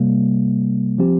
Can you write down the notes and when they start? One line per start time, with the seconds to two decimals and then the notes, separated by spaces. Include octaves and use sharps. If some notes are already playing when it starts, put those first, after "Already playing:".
Already playing: C3 G3 A#3
0.98 F3 C4 G4